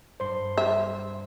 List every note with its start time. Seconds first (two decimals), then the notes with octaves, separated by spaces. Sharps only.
0.20 G2 C5 C6
0.57 E5